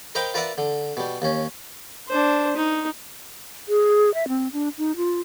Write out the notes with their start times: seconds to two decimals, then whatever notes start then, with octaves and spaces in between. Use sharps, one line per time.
0.15 A#4 C5 D#5 F5 G5 B5
0.34 F4 A#4 B4 D5 E5 F#5
0.58 D3
0.97 B2 G3
1.22 D#2 C#4
2.08 D4 C5
2.56 D#4
3.68 G#4
4.14 E5
4.28 C4
4.53 D4
4.78 D#4
4.96 F4